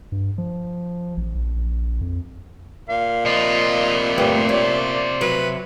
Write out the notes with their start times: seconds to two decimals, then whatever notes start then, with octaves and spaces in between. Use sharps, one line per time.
0.12 G2
0.38 F3
1.17 A1
1.35 A#1
2.01 F2
2.89 A#2 F5
3.25 C3 F4 D#5
4.18 D2 G2 B3 G4
4.49 C#4 D5
5.21 F#3 B4